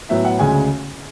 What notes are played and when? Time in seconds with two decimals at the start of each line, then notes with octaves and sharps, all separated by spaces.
0.09 A2 F#3 B3 E5
0.25 F#5
0.39 D2 C#3 G#3 G#5